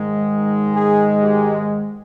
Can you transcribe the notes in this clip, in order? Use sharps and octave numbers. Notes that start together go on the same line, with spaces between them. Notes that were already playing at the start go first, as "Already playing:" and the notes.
Already playing: G#2 D#3 G#3
G#4
G4